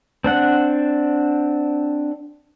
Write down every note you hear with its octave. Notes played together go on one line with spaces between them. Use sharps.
C4 D4 F#5